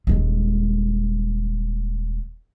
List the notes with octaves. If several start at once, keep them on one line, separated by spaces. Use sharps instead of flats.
D#1 G#3